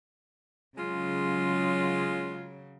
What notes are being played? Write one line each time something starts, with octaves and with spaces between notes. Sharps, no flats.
C#3 F#3 G#3 F4